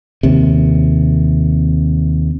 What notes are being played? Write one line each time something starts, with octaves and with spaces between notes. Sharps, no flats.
D#2 C3